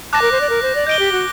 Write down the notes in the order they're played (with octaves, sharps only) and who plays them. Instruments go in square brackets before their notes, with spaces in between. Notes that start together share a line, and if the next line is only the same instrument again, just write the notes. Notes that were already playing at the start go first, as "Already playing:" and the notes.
[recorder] A5 [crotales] D6 F#6 A#6
[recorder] A#4
C5
D5
A#4
C5
D5
[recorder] D#5 [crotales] G6 D7 G7
[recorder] G4
F#4